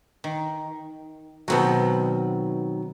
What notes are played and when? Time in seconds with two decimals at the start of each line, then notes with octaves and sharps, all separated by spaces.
0.24 D#3
1.48 B2 D#3 F#3 B3 C4 F#4